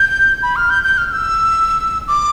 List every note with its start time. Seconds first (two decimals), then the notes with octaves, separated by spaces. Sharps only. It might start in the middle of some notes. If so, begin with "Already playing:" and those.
Already playing: G6
0.43 B5
0.56 F6
0.70 G6
0.84 G6
0.98 F6
1.12 E6
2.08 D6